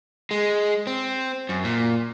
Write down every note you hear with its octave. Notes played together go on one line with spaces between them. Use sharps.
G#3
C4
F#2
A#2